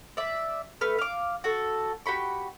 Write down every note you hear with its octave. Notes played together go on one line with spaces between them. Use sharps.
D5 E5
A3 B4 F6
F5 D6
F#4 A4
F#4 G4 B5 C#6